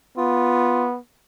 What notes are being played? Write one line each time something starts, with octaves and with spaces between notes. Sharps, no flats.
B3 F4